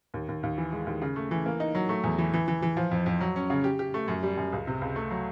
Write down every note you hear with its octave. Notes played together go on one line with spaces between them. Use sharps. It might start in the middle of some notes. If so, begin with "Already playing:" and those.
D#2
D#2
D#2
E3
G#3
D#2
C#3
A3
E3
A#3
D#4
F#3
A3
E2
E3
E3
E3
E3
F3
F2
F2
F#3
C#4
C#3
G4
G4
A3
F#2
G3
F#2
C#2
C3
C#2
A3
F#3